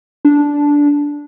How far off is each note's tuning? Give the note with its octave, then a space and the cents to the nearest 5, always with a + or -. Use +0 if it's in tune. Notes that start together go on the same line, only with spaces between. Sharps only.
D4 -10